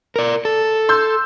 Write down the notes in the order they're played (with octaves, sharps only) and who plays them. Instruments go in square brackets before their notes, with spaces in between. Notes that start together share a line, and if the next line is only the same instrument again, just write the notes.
[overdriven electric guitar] A#4 D5
A4
[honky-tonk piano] C6 E6 G6